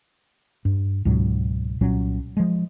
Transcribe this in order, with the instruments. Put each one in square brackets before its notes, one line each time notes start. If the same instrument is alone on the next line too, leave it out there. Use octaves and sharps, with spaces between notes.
[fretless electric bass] G2
C#2 G#2 B2 F#3
C2 A#2 F#3 C#4
F3 G#3